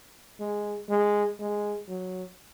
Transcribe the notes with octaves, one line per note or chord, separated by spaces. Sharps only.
G#3
G#3
G#3
F#3